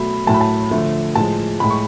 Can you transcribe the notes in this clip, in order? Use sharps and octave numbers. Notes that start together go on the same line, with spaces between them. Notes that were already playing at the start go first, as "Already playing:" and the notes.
Already playing: B2 F#3 A3 B5
A2 F#3 A3 A5
B5
A5
D3 F3 A3
A2 F3 G#3 A5
A2 G#3 B5
C#6